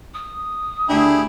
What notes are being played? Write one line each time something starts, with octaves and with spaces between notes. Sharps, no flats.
D#6
D2 D4 E4 G4 G#4